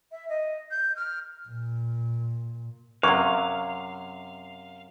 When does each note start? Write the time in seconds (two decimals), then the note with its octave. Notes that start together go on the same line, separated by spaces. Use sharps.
0.11 E5
0.29 D#5
0.70 G6
0.96 F6
1.48 A#2
3.03 F#2 C3 C5 F5 C#6